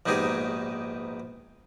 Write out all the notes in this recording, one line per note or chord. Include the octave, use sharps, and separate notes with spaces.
A#1 G#2 B2 D#4 G4 G#4